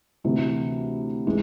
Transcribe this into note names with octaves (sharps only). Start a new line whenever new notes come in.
D2 C3 E3
E3 G#3